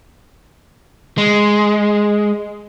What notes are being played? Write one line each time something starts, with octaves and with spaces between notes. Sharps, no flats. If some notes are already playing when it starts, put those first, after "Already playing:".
G#3